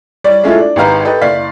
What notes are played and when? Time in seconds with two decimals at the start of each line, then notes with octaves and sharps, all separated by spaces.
0.24 G3 C#5 D5
0.44 G#3 A3 C#4 E4 F4 A4
0.58 D4
0.76 G#1 G#2 G4 B4 F5 A#5
1.05 G4 A4 B4 D#5
1.21 F#1 D5 F5 B6